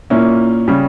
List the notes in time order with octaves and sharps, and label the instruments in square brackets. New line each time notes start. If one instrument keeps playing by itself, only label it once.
[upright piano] A#2 A#3 C#4 E4
C#3 G3 C#4